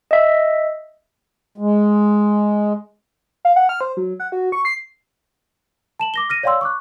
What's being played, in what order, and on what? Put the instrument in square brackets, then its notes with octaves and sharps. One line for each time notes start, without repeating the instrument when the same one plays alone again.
[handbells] D#5 E5
[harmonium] G#3
[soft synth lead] F5
F#5
F6
C5
F#3
F#5
F#4
C#6
C7
[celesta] A5 E7 F#7
D6 A#6 G7
F6 A#6 D#7
C#5 D5 F5 G5 C6 E6
C#6 D6 F#6